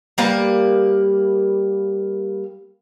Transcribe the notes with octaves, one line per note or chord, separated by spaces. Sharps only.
G3 A#3 B4